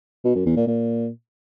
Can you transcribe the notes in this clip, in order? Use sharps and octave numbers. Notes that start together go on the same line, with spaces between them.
B2
F#2
E2
A#2
A#2